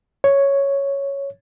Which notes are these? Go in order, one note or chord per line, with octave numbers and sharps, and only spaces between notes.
C#5